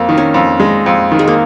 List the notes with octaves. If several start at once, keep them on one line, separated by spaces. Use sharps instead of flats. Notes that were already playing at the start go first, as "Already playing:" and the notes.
Already playing: F2 A#3
D#3
C#4
F2
G#3
F2
D#3
G#3
A#3